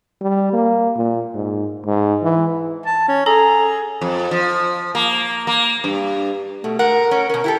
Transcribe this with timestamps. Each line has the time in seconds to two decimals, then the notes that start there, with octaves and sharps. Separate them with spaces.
0.21 G3
0.53 A#3
0.96 A#2
1.35 G#2
1.86 G#2
2.23 E3
2.86 A5
3.08 C#4
3.26 G#4 A4 A#5
4.01 F2
4.31 F3
4.95 A#3
5.47 A#3
5.84 G2
6.64 B2 A3
6.79 G#2 A#4 F#5
7.11 C#4
7.30 B2 C#4 A#4
7.44 E4 G4 A4